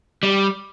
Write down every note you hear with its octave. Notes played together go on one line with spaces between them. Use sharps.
G3